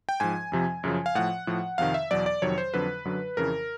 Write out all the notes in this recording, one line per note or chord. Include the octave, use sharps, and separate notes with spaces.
G5
G#2 F3 G#5
F2 C3 F3
F#2 C#3 F3
F5
A2 F3 F#5
A2 F3
F2 C3 D#3 F5
E5
E2 B2 F#3 D5
D5
F2 C3 D#3 F#3 C#5
C5
F2 D3 F#3 B4
F#2 D3 F#3
F2 C#3 E3 A#4